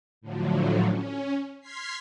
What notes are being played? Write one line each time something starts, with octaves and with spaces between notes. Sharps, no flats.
A2 D3 F3 F#3
C#4
C6 F6 G#6 B6 C7